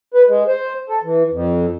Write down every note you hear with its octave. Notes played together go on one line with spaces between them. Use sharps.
B4
G#3
C5
A4
E3
F2